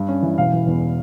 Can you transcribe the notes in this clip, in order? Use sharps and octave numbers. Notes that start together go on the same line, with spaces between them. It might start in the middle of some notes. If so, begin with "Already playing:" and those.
Already playing: G2
C#4
E3
E1 F5
E3
E2